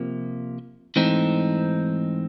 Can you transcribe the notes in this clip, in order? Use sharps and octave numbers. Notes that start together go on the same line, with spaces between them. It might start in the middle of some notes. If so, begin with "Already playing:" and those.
Already playing: C3 F3 A#3
G#2 E3 A3 C4 D#4